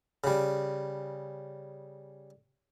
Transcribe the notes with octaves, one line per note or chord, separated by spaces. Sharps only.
C#3 G3